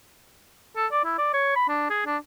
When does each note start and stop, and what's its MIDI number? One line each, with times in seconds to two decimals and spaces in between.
0.77 0.87 69
0.92 1.04 74
1.05 1.15 64
1.18 1.30 74
1.34 1.53 73
1.56 1.66 83
1.69 1.89 62
1.90 2.04 68
2.06 2.18 62